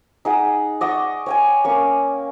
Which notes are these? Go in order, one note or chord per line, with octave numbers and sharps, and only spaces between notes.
D#4 G#4 F#5
D5 D#5 F#5 C#6
C#5 G5 G#5
A#3 C#4 C#6